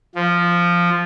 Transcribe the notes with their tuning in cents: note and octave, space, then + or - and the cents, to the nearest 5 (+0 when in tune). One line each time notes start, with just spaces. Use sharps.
F3 -5